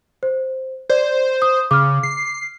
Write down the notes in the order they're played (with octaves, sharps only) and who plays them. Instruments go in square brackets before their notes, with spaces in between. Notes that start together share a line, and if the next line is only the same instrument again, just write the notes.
[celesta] C5
[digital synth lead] C5 [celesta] D5
[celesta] D#6
[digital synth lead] C#3 [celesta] D6 F6
[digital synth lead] C7